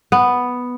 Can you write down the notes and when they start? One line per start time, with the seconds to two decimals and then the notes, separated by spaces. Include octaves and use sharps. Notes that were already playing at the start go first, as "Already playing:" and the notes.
0.12 B3